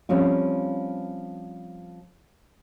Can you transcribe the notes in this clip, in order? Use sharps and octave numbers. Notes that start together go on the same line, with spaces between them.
F3 G3 C4 C#4 F4